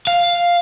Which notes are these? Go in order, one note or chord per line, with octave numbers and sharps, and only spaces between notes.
F5